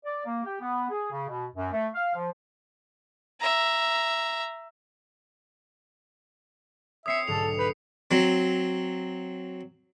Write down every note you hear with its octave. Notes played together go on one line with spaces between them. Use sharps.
D5
A#3
G4
B3
G#4
C#3
B2
F#2
A3
F5
F3
E5 A#5
C4 C#5 E5 D#6 C7 C#7
B1 G#2 D3 A4 F7
B4 B5 G6 B6
F#3 C4